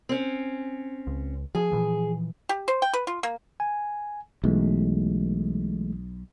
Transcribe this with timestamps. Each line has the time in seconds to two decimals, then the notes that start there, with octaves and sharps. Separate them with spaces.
0.09 C4 C#4
1.07 C#2
1.55 F3 G#4
1.72 A#2 E3 F3
2.49 G4
2.68 C5
2.82 G5
2.93 B4
3.07 F4
3.23 A#3
3.60 G#5
4.44 B1 E3 G#3 A3